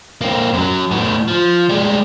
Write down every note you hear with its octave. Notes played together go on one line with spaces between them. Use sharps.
A#3 C4
F#2 F#3
A2 B3
F3
G3 G#3